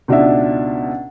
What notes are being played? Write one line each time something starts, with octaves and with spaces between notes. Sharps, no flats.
C#2 B2 D4 D#4 E5